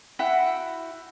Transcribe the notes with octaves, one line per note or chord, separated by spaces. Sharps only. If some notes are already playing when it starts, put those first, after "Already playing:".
E4 F#4 F#5 G5